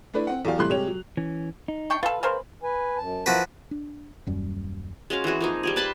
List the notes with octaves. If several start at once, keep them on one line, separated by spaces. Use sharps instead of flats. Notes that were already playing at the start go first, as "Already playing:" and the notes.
A3 D4 E4 B4 D5
C4 F#5
E2 F#3 G4 D5 F5
G2 C3 E3 A3 C6 F#6
C3 G3 G#3 G4 C#5 F7
F#3
E3 C#4
D#4
D4 G5 C#6
F4 A4 B4
C#3 A#4 C5
B4 G#5
F#2 A5
F3 E4 F#4 A#4 B4
D4
D#1 F#2 G3
G#3 C#4 F#4 F5
E3 C4 F#4 G#4
F3 A#3 D#4
G3 G4 G#4
B4 A5 B5 C6